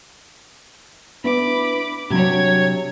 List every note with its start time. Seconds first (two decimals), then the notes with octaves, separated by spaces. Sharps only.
1.24 B3 D4 E4 B5 D6
2.10 C3 F#3 D4 C#5 G#6